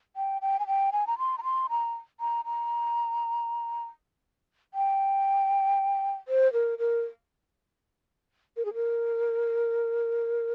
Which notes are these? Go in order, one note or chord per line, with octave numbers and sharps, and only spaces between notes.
G5
G5
G#5
G5
G#5
A#5
C6
A#5
C6
A#5
A#5
A#5
G5
C5
A#4
A#4
A#4
G#4
A#4